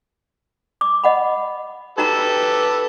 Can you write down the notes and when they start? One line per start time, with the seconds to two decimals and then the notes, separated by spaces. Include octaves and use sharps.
0.81 D6
1.04 D#5 F#5 B5
1.98 D#4 F#4 G4 A4 B4 A#5